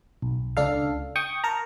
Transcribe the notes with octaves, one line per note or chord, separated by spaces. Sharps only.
B1
C#2 D4 A4 F5
G5 C#6 D#6
A#4 A5 A#5